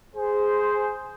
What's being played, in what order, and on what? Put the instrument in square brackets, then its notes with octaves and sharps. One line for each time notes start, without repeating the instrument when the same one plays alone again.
[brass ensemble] G#4 C5